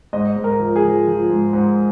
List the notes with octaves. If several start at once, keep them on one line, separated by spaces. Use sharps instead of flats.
G#2 D#5
G#2
A#4
F3
G#4
F3
F3
G#2
G#2